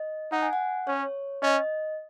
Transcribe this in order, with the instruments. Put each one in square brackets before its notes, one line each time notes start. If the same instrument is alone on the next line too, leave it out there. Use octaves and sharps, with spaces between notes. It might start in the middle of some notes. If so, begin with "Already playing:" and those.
Already playing: [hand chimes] D#5
[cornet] D#4 [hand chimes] F#5
[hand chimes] G#5
F#5
[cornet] C#4 [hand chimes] C#5
[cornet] C#4 [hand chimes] D#5